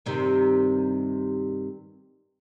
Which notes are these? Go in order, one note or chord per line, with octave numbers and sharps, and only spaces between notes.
G2 C3 D#3